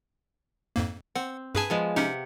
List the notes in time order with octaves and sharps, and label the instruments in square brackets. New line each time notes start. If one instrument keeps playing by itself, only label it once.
[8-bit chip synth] F2 G#2 A#3
[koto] C4 [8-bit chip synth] F#5
[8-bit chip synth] G2 G#4 A5 [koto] B4 G#5
[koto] F3 G#3 B3
[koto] C3 G4 F#5 [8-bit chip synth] C#4 D#4